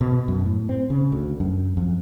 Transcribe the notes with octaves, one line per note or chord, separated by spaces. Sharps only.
B2
F#2
A2
C4
C#3
D2
F#2
F2